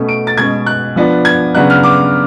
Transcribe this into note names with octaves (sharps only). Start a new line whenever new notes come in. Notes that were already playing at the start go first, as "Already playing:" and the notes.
Already playing: B2 A3 C#4
D7
A6
B2 G#3 C#4 G#6
F#6
F3 B3 D4
G#6
C#3 F#3 B3 D4 F#6
F6
D6